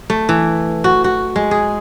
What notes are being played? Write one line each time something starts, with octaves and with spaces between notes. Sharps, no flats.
A3
E3
F#4
F#4
G#3
G#4